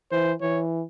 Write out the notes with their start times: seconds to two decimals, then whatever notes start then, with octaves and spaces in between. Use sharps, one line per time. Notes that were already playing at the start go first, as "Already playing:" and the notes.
0.12 E3 C5
0.41 E3 C#5